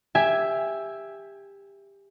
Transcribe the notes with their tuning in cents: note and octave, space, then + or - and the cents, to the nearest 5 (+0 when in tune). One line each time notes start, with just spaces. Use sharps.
G4 +20 E5 +0 G#5 +0